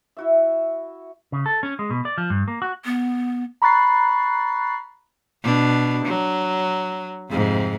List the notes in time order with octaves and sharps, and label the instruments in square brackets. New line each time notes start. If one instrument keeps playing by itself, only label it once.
[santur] E4 F#4 E5
[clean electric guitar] C#3
A4
C#4
G#3
B2
D5
F3
G2
A#3
F#4
[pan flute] B3
[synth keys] A#5 B5 C#6 F#6 A6 C7
[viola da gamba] B2 D4
F#3
F2 G#2 C3